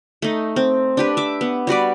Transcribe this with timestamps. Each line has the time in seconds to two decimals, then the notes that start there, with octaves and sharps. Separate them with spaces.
0.22 A3 D#4
0.56 C4
0.97 D4 G4 B4
1.17 E5 D6
1.41 B3
1.67 G3 F#4 B4 D5